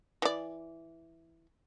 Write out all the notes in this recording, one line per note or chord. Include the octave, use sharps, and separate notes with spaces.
E3 D5